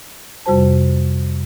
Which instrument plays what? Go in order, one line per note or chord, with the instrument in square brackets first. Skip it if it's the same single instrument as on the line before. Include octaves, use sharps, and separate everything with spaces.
[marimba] F2 C3 G3 F#4 C5 A5